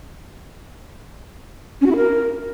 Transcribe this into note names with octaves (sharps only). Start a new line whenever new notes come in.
C#4
F#4
E4
A#4